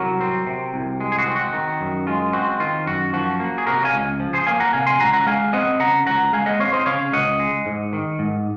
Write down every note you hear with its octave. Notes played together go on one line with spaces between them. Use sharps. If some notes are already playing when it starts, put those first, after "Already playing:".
Already playing: C2 F#3 F#4 A#4
C4
C3
C2
G#3
G#4
F#4
C4
F#4
D#3
F#2
G#3 F4
C4 F#4
D#3 F4
F#2 F#4
F3 F#4
A#3
G#4
C3 F#4 A#4
F5 G#5
C#2
F3
G#4 C5
A#3 F5 G#5
F#5 A#5
C3 F5 G#5
G#5 C6
C#2 F#5 A#5
F#5 A#5
G#3 F5 G#5
C4 D#5 F#5
C#3 F#5 A#5
C#2 F#5 A#5
G#3 F5 G#5
D#5 F#5
C4 C#5 F5
C5 D#5
C#3 C#5 F5
C#2 D#5 F#5
G#3
G#2
D#3
G#2